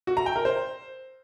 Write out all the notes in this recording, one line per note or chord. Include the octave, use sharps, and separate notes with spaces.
F#4
A#5
G5
A#4
C5